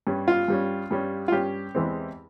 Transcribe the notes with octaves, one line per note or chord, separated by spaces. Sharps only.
G2 G3 C#4
F4
G2 G3 C#4
G2 G3 C#4
F4
G2 G3 C#4 G4
E2 E3 G#3 C4